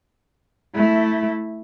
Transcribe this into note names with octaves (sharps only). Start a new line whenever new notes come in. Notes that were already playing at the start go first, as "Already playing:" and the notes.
A3 E4